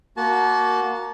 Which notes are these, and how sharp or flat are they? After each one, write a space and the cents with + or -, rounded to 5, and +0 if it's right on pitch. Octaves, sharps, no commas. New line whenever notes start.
A#3 +0 F#4 +0 A5 -30